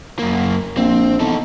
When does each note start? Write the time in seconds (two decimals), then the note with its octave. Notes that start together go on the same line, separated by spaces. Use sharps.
0.19 F#2 A#3
0.77 A#1 C4
1.20 E2 D#4 A4